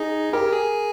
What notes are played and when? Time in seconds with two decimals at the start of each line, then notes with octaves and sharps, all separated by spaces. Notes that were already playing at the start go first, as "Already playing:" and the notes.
Already playing: D#4 G#4
0.33 G4 A#4
0.53 G#4